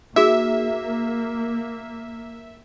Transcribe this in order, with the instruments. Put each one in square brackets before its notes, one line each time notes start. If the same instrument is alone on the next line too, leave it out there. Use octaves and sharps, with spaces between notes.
[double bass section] A#3 [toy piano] D#4 F#4 G#4 [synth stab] E5